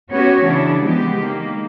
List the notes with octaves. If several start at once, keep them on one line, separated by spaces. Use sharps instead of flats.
B3 C#4 F#4 G4 C#5
C#3 E3 D4 E4
F3 G#3 B3 G4
D#3 A#3